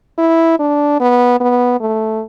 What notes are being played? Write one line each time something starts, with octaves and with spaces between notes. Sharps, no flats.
E4
D4
B3
B3
A3